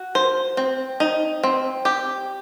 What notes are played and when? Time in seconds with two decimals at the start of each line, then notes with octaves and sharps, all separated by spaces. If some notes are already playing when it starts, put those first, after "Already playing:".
Already playing: F#4
0.15 C5
0.57 C4
1.00 D#4
1.44 C4
1.85 G4